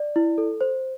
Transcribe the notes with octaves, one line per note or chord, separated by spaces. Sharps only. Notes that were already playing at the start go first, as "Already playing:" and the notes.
Already playing: D5
E4
A4
C5